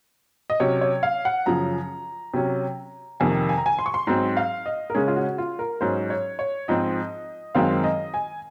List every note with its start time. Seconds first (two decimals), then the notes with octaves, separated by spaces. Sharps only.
0.50 D#5
0.60 C3 F#3 C#4 C#5
0.81 C#5
1.03 F5
1.25 F#5
1.46 F#2 C#3 F3 A#5
2.34 C3 F#3 C#4
3.20 F2 C3 D#3 A#3 G#5
3.49 G#5
3.58 A#5
3.66 G#5
3.79 C6
3.86 C#6
3.94 C6
4.07 G#2 F#3 C4
4.37 F5
4.66 D#5
4.90 A#4
4.95 C#3 G#3 C#4 G#4
5.08 F4
5.16 F#4
5.38 F4
5.59 A#4
5.81 G#2 F#3 C#4 C5
6.10 C#5
6.39 C#5
6.68 G#2 F3 C4 D#5
7.55 F#2 D#3 G#3 C4 F5
7.84 D#5
8.14 G#5